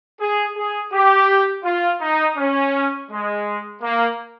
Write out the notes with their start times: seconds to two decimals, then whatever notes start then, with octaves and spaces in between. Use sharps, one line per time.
0.19 G#4
0.55 G#4
0.92 G4
1.64 F4
2.00 D#4
2.37 C#4
3.09 G#3
3.82 A#3